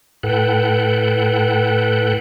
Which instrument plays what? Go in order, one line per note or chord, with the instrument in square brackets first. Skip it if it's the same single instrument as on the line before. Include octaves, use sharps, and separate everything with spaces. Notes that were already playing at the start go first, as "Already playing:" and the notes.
[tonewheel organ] A2 A4 B4 F#5 G5